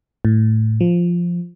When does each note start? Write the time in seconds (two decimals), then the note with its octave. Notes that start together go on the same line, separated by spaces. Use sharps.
0.25 A2
0.81 F3